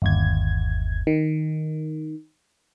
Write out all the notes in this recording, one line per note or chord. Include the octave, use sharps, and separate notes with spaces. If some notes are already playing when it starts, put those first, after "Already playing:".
G1 D#2 G#6
D#3